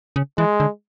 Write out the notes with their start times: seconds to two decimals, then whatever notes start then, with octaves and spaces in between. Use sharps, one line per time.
0.16 C#3
0.38 E3 G#3
0.60 D3